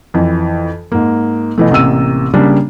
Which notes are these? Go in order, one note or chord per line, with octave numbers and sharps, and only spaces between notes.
F2 E3
G#2 A#3
B2 E3 A3
A1 C3 A#3 E6 D#7
C#3 G3 A#3 D4